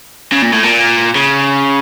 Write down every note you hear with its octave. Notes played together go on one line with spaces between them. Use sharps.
C#3
A#2
A2
A#2
C#3